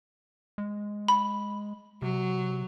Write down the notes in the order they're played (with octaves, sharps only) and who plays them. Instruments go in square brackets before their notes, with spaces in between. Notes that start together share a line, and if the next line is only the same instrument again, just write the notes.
[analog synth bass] G#3
[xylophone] B5
[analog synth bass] C3 [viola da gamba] F#3